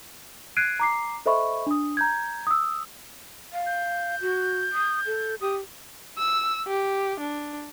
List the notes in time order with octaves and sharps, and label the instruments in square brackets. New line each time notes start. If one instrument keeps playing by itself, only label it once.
[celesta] F#6 G#6 C7 D7 D#7
A#5 D6 C7
A4 C5 D#5 E5 B5 C#6
D4 D#6
A#5 G6 G#6
D#6 E6
[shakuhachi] F5
[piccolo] G6
[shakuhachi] F#4
D#6
A4
[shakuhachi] G4 [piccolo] D#6
[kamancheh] E6
G4
D4